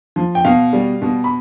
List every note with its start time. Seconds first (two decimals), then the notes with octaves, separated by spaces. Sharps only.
0.16 F3
0.35 G5
0.44 B2 F5
0.73 G3
1.02 B2
1.24 B5